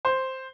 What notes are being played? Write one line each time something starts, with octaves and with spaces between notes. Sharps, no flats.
C5